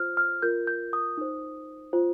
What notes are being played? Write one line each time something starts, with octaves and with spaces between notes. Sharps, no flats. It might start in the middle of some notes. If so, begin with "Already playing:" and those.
Already playing: F4 C5 F6
F6
F4 A#4 G6
G6
D#6
D#4 C5
F4 C5